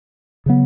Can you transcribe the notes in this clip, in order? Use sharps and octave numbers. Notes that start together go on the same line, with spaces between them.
C#3 F#3 B3